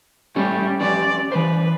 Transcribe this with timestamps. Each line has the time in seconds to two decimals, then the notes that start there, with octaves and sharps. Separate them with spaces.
0.36 G3 A3 C#4 G4
0.81 C#4 G4 B4 D5
1.32 E3 B4 C5